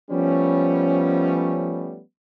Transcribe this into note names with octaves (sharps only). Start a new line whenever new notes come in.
F3 G3 A3 B3 C#4